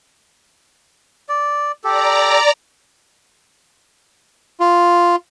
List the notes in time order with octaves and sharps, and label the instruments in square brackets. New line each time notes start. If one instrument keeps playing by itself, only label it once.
[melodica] D5
[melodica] G4 A4 [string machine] D5 A#5
[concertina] F4